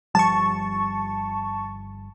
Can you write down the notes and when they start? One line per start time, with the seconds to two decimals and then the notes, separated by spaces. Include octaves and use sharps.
0.15 G1 F3 G3 A5 C#6